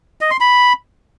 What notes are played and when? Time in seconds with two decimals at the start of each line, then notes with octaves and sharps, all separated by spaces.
0.21 D#5
0.31 C6
0.40 B5